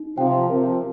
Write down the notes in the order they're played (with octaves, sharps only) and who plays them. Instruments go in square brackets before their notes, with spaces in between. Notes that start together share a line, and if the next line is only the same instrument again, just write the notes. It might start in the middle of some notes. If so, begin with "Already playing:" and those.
Already playing: [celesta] D#4
[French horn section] C3 F3 [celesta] G5
[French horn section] C3 F3 [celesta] A#4